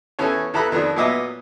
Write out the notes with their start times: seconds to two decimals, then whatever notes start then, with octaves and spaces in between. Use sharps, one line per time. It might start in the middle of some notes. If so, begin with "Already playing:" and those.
0.19 E2 C#4 A4 C#5
0.54 E2 A4 A#5 B5 F#6
0.72 F2 D#3 F3 D4
0.96 A#2 F#3 B3 D#5 E5 D6